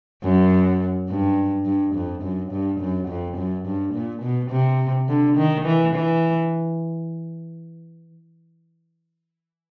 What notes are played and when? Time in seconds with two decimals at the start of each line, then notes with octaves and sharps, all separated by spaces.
0.24 F#2
1.09 G2
1.66 G2
1.95 F2
2.22 F#2
2.52 G2
2.80 F#2
3.08 F2
3.37 F#2
3.65 G2
3.94 A#2
4.22 B2
4.50 C3
5.08 D3
5.37 D#3
5.65 E3
5.94 E3